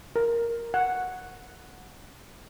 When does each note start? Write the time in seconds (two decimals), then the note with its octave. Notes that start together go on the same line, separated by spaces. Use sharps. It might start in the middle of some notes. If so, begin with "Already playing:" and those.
0.16 A#4
0.74 F#5